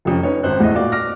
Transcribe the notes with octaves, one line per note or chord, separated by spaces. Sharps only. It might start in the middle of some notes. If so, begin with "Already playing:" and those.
F1 F2 C#4
C#4 D#4 B4 C#5
G#1 C4 C5 F#6
E2 A2 E4 D#5
A#2 F#4 D5 F5 D6
D6 F6 A#6